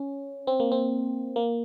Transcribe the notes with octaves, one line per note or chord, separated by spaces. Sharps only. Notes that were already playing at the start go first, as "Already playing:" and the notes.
Already playing: C#4
C4
A#3
C4
A#3